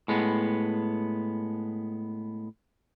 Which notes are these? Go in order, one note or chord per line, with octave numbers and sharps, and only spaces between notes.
A2 G#3 B3